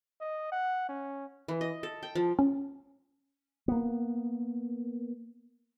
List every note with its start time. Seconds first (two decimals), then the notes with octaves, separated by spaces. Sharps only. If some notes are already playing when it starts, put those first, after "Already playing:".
0.21 D#5
0.52 F#5
0.89 C#4
1.48 E3
1.61 D#5
1.83 A4
2.03 G5
2.15 F3
2.39 C#4
3.68 A#3 B3